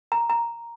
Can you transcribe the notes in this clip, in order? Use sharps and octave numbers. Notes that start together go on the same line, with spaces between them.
A#5
A#5